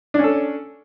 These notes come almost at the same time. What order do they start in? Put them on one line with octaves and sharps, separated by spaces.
D4 C#4 A4